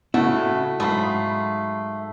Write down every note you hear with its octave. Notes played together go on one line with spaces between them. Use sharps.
A2 C#3 A3 E4 F#4
G#2 F#3 A3 F5 B5 D#6